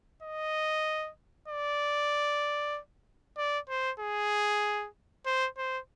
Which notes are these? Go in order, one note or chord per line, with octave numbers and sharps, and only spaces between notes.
D#5
D5
D5
C5
G#4
C5
C5